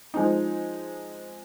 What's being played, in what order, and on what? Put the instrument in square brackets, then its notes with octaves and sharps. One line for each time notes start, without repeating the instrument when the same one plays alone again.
[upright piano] F3 G#3 C4 D#4